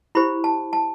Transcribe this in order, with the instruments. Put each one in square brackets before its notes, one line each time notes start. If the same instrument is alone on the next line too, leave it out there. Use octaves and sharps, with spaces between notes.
[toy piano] E4 G4 C5 B5
A5
A5